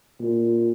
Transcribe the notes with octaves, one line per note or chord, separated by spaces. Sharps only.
A#2